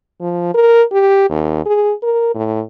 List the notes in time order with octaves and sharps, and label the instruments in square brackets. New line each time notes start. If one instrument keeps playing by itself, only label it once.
[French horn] F3
A#4
G4
D#2
G#4
A#4
A2